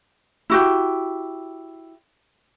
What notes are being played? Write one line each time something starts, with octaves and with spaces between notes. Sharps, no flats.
E4 F#4 G4